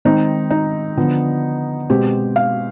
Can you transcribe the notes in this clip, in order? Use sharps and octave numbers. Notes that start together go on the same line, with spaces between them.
D#3 G#3 C4 D#4
D#4
D3 F3 B3
B2 G#3 C4 G4
F5